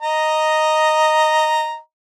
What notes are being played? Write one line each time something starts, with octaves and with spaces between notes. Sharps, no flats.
D#5 A#5